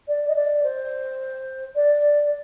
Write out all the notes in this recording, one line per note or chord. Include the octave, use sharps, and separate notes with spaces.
D5
D#5
D5
C5
D5